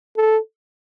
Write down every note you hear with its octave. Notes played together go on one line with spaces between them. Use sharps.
A4